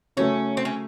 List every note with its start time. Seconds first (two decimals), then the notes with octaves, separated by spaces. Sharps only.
0.17 C#3 F#3 A3 C#4
0.57 C4
0.65 C#4